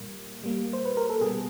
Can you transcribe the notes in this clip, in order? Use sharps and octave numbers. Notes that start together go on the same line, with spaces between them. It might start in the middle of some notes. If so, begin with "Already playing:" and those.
Already playing: A#2 G3 A#3
A#2 G3 A#3
C5
B4
A#4
A4
B2 G3 B3 G#4